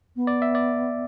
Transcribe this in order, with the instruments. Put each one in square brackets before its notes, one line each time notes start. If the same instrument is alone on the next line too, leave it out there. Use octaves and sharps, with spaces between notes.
[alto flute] B3
[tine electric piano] D5
E5
D5